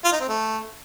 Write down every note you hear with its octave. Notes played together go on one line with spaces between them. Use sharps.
F4
D#4
C4
A3